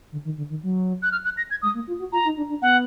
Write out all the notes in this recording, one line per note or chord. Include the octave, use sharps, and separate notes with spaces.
D3
D#3
D3
D#3
F#3
F#6
F6
F#6
A#6
G#6
G#3 D#6
A#3
F4
F#4
F4 A#5
D#4
D4
D4
B3 F#5